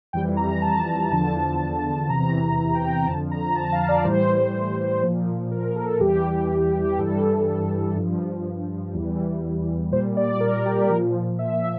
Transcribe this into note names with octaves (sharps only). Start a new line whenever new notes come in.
F2 E3 G3 G5
A#5
A5
E2 D3 F3 A5
E2 C3 E3 A#5
G5
A#5
F2 D3 F3 A5
A#5
A5
F5
D5
A2 E3 G3 C5
A#2 F3
A#4
A4
E2 E3 G3 G4
G4
G2 E3 G3 A4
G2 F3
E2 E3 G3
A#2 G3 C5
D5
A#4
G4
A#2 F3 A#4
E5
E5